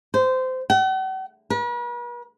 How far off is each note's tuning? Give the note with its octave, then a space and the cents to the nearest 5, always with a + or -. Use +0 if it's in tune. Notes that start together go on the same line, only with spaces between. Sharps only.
C5 -20
F#5 +45
B4 -45